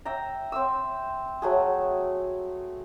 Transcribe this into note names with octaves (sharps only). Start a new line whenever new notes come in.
E5 G5 A#5
C4 E5 E6
F#3 A3 G#4